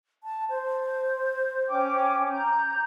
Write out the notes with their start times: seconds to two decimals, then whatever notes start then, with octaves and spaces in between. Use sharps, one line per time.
0.24 A5
0.50 C5
1.68 C#4 G5 D6
2.31 A#5 G6